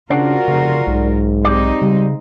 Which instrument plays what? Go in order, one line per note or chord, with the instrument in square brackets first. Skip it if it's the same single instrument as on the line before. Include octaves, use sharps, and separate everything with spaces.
[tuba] C#3 [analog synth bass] D4 [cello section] F4 F#4 A#4 [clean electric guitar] C5 D5 F#5
[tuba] F1 [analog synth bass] C#3
[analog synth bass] B1 [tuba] G#2
[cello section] G#3 C4 D#4 [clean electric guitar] G4 D5
[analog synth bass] C#3 [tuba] G3